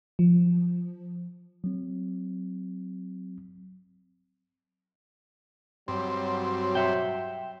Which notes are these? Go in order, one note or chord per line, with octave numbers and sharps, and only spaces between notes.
F3
F#3 C4
G2 F#3 C4
E5 G5